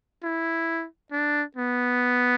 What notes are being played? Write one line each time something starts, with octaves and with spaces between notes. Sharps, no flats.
E4
D4
B3